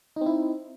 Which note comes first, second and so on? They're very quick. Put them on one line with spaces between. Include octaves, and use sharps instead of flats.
D#4 C4 E4